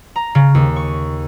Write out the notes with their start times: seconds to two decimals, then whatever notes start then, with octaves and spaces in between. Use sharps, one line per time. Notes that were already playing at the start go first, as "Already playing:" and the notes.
0.16 A#5
0.35 C#3
0.55 D#2
0.76 C#6